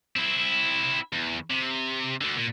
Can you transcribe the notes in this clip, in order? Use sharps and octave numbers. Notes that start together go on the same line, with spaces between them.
C4 E4
E2
C3
D2 D3
A#2